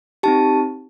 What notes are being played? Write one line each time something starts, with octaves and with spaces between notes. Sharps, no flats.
C4 D#4 G4 A5